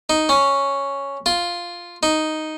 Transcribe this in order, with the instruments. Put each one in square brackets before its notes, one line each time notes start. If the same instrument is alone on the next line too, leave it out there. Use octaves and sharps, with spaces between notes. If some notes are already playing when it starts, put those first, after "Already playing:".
[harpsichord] D#4
C#4
F4
D#4